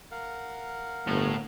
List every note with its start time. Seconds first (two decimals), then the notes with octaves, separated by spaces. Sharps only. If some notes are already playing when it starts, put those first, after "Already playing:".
0.11 A#4 F5 F#5
1.07 G1 A2